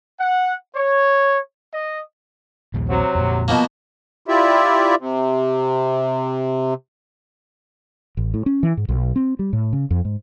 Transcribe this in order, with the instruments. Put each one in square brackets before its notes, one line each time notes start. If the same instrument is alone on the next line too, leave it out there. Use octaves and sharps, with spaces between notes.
[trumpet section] F#5
C#5
D#5
[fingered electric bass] A#1 D#2 A#2
[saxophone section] C3 F#3
[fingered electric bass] F2 A#2
[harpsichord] B2 F3 A#3
[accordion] E4 F4 G4 D5 E5
C3
[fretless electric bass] A1
A2
C#4
E3
G#2
B1
C4
G3
A2
C#3
F2
G#2